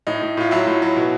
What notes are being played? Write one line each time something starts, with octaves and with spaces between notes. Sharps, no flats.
A2 D#4
A2
A2 F4
F#3 E4
A2
F#3
B2